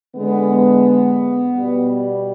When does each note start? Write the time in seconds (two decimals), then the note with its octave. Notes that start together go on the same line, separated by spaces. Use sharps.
0.16 D3 G#3 B3
1.57 B2 G3